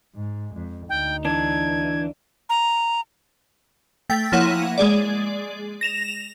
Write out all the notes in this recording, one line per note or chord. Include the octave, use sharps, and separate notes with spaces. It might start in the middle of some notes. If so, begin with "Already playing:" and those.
G#2 G#3
F2
D2 D#4 G5
E3 D4 G#6
A#5
A3 G5 A6 B6
F3 A#3 E4 C#5 F#5 D#7
G#3 G#4 D5
A#6 E7 F7